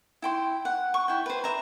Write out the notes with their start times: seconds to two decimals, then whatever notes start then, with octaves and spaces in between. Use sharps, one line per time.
0.22 E4 G5 C6
0.65 F#5
0.94 C#6
1.08 E4 G5
1.26 B4 C5
1.44 E5 A#5